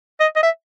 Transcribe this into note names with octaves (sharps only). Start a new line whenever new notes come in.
D#5
D#5
E5